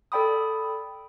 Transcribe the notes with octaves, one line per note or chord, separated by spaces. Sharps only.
A4 D5 G5 B5 D#6